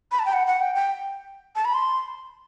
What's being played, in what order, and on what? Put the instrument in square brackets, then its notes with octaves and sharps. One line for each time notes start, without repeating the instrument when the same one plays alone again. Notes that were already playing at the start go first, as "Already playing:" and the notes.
[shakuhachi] B5
A5
G5
F#5
F#5
G5
G5
A5
B5
C6